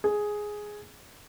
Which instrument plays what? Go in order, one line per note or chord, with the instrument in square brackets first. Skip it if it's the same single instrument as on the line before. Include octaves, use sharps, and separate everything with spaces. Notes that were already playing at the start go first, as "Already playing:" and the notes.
[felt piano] G#4